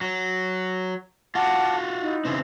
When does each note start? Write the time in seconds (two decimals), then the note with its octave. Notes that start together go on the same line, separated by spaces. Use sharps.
0.01 F#3
1.35 F4 F#4 F#5 A5 D6
2.01 D#4 E4
2.25 C#3 E3 C4